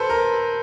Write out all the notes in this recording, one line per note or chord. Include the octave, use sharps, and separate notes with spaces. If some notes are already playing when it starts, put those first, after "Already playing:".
Already playing: A4 B4 C5
A#4